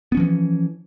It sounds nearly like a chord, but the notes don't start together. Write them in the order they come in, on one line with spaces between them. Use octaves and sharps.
B3 C#4 F3 E3